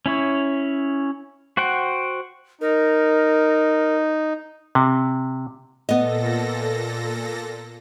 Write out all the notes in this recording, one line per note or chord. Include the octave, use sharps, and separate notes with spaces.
C#4 E4 C#5
F#4 C5 F#5 G5
D#4 A#4
C3
A#2 B3 A4 D#5 A#6